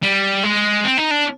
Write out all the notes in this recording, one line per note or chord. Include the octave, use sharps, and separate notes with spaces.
G3
G#3
C4
D#4
D4